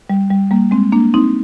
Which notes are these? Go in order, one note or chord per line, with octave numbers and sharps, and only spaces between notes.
G3
G3
G3 A#3
G#3 C4
A#3 D4
C4 D#4